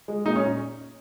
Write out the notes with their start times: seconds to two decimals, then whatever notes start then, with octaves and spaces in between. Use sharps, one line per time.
0.08 G#3
0.25 A#2 D#4
0.36 C#4